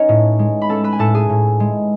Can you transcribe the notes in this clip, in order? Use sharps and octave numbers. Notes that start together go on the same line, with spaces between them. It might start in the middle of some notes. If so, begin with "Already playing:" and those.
Already playing: C#4 D#4 B4 C#5 D#5
A2
G#3
B5
C#4 A4 A5
B4 B5
G#5
A2 A4 A5
G#4 G#5
A2
G#3